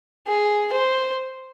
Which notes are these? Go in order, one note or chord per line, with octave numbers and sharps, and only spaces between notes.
G#4
C5